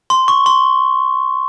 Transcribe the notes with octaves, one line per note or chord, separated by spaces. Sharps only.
C6
C#6
C6